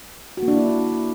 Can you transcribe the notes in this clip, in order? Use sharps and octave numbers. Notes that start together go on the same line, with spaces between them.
F#4
A#3
D4
E4